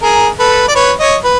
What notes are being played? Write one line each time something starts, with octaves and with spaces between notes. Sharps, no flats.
G#4 A#4
A4 B4
D5
B4 C#5
C#5 D#5
B4